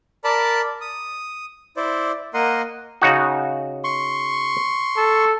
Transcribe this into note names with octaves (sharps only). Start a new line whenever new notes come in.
A#4 D5 A5 B5
D#6
E4 C5 D5
A#3 A#4 D#5 F#5 C6
C#3 D#4 F#4
C6 C#6
A4